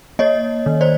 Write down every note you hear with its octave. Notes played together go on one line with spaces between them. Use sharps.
A#3 C#5 D#5
D#3
C5 D5